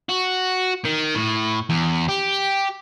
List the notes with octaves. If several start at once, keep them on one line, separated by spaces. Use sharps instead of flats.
F#4
D#3
A2
E2
G4